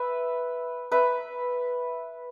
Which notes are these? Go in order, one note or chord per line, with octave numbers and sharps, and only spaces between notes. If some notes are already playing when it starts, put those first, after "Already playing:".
Already playing: B4 E5
B4 E5